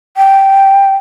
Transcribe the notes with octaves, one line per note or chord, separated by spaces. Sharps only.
G5